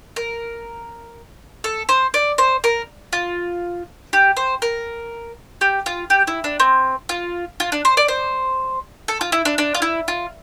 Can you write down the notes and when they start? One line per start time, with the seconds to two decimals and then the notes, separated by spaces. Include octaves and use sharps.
0.16 A#4
1.64 A4
1.89 C5
2.14 D5
2.38 C5
2.64 A#4
3.13 F4
4.13 G4
4.37 C5
4.62 A#4
5.61 G4
5.86 F4
6.10 G4
6.27 E4
6.44 D4
6.60 C4
7.09 F4
7.60 F4
7.72 D4
7.85 C5
7.97 D5
8.08 C5
9.08 A4
9.21 F4
9.32 E4
9.45 D4
9.58 D4
9.75 F4
9.82 E4
10.08 F4